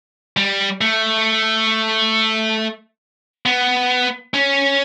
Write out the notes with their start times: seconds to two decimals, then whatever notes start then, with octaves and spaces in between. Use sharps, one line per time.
0.37 G3
0.81 A3
3.46 B3
4.34 C#4